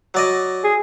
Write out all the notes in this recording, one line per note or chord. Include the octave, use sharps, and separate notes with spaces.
F#3 D5 D#5
G#4